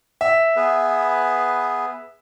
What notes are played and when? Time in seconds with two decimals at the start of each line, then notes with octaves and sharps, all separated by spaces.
0.21 E5
0.56 B3 G#4 B4